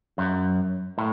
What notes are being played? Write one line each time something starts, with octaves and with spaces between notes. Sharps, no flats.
F#2
A2